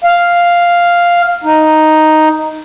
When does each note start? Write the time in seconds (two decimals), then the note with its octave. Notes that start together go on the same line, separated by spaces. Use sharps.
0.04 F5
1.44 D#4